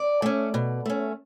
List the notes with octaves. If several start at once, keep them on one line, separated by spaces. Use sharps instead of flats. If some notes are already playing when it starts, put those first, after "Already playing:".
Already playing: D5
A3 C#4
B2
A3 C#4